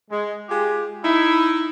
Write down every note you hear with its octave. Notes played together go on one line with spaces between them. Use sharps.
G#3
G#3 F4 G4
D#4 E4